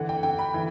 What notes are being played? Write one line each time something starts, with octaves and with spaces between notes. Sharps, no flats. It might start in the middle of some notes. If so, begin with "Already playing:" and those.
Already playing: D3 E3 F#5
G5
D3 G5
B5
E3